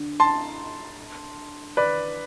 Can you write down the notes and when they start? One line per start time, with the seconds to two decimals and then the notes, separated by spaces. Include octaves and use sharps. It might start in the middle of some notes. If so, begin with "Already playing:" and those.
Already playing: D3
0.20 A5 C6
1.77 B4 D5